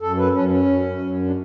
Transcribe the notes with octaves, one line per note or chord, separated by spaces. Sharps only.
F#2 A4
B4
F#2 C#4
C#4
F#2
F#2
D4